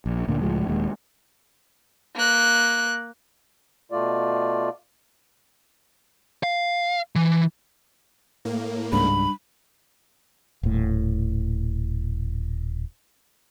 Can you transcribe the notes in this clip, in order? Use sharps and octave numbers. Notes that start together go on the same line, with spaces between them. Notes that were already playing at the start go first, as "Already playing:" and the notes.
A#1
D2 A#2 D3 A#3
C#2 A2 F3 G#3
D#1 D#2 G#3
A#3 F#6
B2 A3 F4 D5
F5
E3
A2 A#3
C#2 G#2 G3 D4 B5
D#1 A2